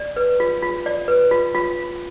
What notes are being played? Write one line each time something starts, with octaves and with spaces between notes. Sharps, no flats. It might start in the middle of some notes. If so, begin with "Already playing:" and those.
Already playing: D5
B4
F4
F4
D5
B4
F4
F4